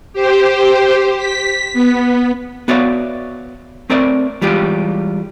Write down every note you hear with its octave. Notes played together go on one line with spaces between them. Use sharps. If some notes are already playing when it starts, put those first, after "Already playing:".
G4 C5
B6
B3
B3 F#4 C#5 D5 E5 F5
A3 C4 A#4 C#5 D5 E5
E3 G3 G#3 F4 G4